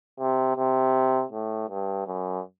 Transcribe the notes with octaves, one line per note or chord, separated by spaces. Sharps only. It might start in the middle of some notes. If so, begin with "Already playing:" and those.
C3
C3
A2
G2
F#2